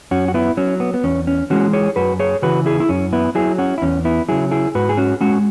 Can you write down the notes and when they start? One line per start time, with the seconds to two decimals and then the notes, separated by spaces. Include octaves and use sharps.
0.11 F#2 C#4 F#4
0.28 F#4
0.34 B3 E4
0.57 F#3 C#4
0.80 B3
0.94 B3
1.04 E2 C#4
1.27 C#4
1.50 E3 G#3 C#4 F#4
1.73 G#4 C#5
1.96 F#2 F#4 B4
2.19 G#4 C#5
2.42 C#3 E3 F#4 B4
2.66 E4 G#4
2.80 E4
2.89 F#2 C#4
3.13 B3 E4
3.35 F#3 E4 G#4
3.58 C#4 F#4
3.78 E4
3.82 E2 C#4
4.05 B3 E4
4.28 C#3 F#3 E4 G#4
4.51 E4 G#4
4.75 G#2 F#4 B4
4.89 G#4
4.97 C#4 F#4
5.21 G#3 C#4 F#4